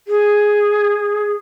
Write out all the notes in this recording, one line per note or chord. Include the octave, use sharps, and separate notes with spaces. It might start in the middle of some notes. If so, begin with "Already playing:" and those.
G#4